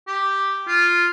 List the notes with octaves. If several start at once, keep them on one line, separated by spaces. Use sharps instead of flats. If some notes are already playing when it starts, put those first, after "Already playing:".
G4
F4